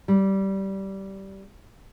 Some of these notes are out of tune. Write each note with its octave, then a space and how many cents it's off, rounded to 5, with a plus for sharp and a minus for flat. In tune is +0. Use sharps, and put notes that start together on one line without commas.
G3 -15